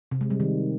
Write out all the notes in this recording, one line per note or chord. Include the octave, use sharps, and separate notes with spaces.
C3
G#3
G3
D#3